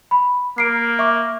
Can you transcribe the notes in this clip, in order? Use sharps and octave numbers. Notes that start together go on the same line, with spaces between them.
B5
A#3 C7 D7
E5 C#6 D6